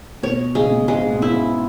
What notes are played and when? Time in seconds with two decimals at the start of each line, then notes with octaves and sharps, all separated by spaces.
0.23 B2 C#5
0.55 C#3 G#3
0.63 B2
0.71 C#3
0.88 G#2 G#3
1.10 B2
1.22 E4
1.33 G#2